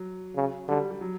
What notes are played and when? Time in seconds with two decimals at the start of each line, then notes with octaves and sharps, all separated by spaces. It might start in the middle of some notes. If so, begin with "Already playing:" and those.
Already playing: F#3
0.35 C#3
0.68 D3 G3
0.90 G3
1.01 F#3